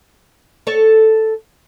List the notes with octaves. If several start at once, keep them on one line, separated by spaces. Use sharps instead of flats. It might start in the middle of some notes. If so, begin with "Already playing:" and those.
A4 C#5